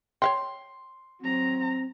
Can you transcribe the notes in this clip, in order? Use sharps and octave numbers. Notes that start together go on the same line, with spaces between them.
C#5 F5 G5 C6
F#3 C4 A#5